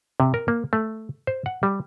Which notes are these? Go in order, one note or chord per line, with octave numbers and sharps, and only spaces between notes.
C3
A#4
A#3
A3
C5
F#5
G3